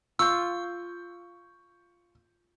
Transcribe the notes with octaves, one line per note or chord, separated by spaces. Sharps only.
F4 C#6 E6 G6